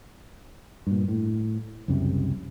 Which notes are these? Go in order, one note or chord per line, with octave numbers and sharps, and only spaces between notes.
G2 A#2
A2
F#1 C2 F#2 C3